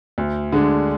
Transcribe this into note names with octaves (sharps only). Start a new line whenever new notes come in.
D2
D3 G#3 D4